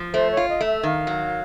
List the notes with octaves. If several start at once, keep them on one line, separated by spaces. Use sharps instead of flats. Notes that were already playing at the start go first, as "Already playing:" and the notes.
Already playing: F3
A3 C5
C#5
F4
D#5
A3
E5
D#3 F5
F#3